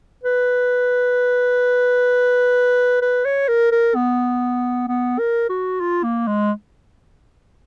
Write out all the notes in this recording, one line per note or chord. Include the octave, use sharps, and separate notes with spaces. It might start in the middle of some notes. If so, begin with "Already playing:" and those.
B4
B4
C#5
A#4
A#4
B3
B3
A#4
F#4
F4
A#3
G#3